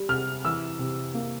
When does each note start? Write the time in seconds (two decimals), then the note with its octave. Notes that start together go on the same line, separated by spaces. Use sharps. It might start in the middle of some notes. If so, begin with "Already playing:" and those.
Already playing: G3
0.09 C3 F6
0.44 E3 E6
0.79 C3
1.15 A#3